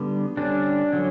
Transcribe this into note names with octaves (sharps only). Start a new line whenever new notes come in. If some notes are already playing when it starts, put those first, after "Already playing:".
Already playing: D3 G3 B3
D3 G3 C#4 D4
D3 F#3 C#4